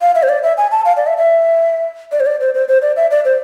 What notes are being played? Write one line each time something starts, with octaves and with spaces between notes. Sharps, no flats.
F5
E5
C5
D5
E5
G#5
A5
F5
D5
E5
E5
D5
C5
D5
C5
C5
C5
D5
E5
D5
C5